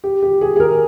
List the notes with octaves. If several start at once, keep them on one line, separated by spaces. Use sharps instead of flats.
G4
G4
G#4
G#4
A#4